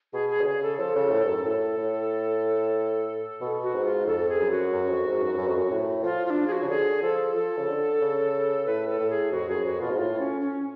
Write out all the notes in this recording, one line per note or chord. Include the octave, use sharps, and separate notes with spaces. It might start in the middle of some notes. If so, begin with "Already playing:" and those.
B2 G#4
G#4
D3
C#3 G#4
A4
F3 A4
C#3
A2
G#2
F#2
A2 A4
A2
B2
F#4
G#2
F4
F2 A4
G#4
F#2
F#4
F#2
F2
G#2
F#2
F#2
F2
F#2
A2
F3 F4
F4
D4
G#4
F#4
C#3
D3 G#4
F3 A4
F3 A4
C#3
D3
C#3
A2 B4
A4
A2
G#4
F2 F#4
F#2 G#4
F2 F#4
B2 F4
G#2
A2 F4
C#4
C#4